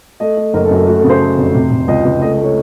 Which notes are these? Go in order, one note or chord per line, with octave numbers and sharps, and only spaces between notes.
A3 D#5
A3
F#1 A#4
A4
F#2
A4
A3 F#4
A4
C#3
C5
A3
F1
C3
C3
C#2 D#5
C#2
A3 D#5
D#5
A3
C#5